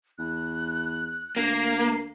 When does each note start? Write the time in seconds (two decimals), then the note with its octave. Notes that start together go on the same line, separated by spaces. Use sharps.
0.19 E2 F#6
1.36 D2 A#3 C7